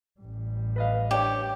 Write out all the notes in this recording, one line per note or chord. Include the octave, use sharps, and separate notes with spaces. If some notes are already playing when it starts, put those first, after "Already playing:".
A1 G3
B4 D#5 F5
D4 G4 C#5 G5